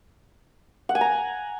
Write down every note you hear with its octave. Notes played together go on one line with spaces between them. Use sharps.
F#5
G#5
A#5